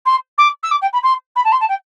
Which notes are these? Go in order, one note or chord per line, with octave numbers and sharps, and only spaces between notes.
C6
D6
E6
D6
G5
B5
C6
B5
A5
C6
A5
G5